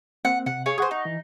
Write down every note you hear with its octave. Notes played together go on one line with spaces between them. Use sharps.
A#3 C4 F#5
C3 F#5
G#4 C#5 F5
G#4 C5 F#5 C#6 D#6
D#4
E3